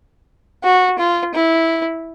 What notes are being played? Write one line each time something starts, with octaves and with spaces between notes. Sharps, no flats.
F#4
F4
E4